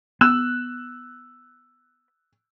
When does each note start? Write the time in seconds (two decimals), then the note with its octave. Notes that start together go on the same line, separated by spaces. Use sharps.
0.21 B3 E6 F#6 E7